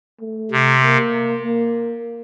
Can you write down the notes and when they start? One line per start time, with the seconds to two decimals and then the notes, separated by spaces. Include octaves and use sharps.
0.21 A3
0.51 C3
0.82 A#3
1.43 A#3